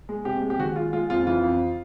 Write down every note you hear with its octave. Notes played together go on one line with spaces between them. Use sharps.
G#3
C3 G4
G#3
G4
D#3 F#4
G#3 F4
G#3 F4
F2 F4
E3 F4
F2